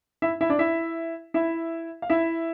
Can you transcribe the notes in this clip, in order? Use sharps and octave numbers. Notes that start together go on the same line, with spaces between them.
E4 E5
E4 E5
D4 D5
E4 E5
E4 E5
F5
E4 E5